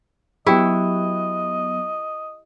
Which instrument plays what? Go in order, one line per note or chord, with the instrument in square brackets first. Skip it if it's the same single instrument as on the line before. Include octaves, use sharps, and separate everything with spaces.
[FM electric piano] F#3 B3 [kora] E4 [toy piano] G4 G5 [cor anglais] D#5